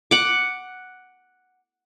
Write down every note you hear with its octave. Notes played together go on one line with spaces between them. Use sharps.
F#5 D6